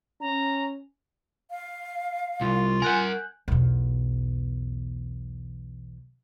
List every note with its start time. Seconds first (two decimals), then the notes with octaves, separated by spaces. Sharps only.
0.21 C#4 A#5
1.51 F5
2.41 C2 F4
2.82 A#4 F#5 G#5 F#6 G6
3.48 B1 E2